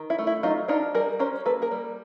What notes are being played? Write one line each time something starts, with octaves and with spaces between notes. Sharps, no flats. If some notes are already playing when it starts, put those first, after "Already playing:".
Already playing: D#3
E4
A3
E4
F#3 D#4 F4
D4 D#4 F4
G3 G#4 A#4
C#4 A#4 C5
A#3 A4 B4
G#4 A#4
G3